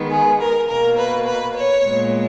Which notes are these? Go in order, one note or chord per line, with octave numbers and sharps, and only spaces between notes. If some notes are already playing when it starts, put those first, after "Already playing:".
Already playing: D#3 G#3 B3
G#4
A#4
B2 A#3 A#4
B4
B4
C#5
A#2 G#3 B3